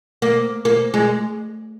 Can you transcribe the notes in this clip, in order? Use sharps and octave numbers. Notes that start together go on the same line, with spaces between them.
A#3
A#3
G#3